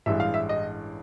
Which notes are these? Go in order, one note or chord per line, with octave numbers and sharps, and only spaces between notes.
A1 G2 E3 G#3 E5
F5
E5
D#5